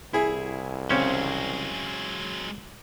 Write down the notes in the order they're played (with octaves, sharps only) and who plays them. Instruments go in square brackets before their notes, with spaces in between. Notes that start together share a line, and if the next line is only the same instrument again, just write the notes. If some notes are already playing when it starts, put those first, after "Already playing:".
[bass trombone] C2 [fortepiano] E4 G#4
[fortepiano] C#3 C4 [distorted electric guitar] F#3 G#3 [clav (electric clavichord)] C#4